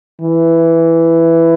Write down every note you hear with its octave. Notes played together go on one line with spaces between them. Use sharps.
E3